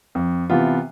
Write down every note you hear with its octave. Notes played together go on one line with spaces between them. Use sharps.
F2
C3 E3 B3 F4